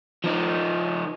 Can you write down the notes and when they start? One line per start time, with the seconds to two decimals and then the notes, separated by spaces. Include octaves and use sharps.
0.24 F3 D#4